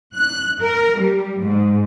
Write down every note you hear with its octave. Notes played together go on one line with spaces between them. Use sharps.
F#6
A#4
G3
G#2